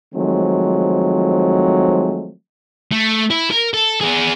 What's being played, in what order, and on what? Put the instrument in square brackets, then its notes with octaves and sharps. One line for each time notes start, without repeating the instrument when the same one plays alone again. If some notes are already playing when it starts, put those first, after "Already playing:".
[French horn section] D#3 F3 F#3 G#3 A3 C4
[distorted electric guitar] A3
E4
A#4
A4
B3 G#4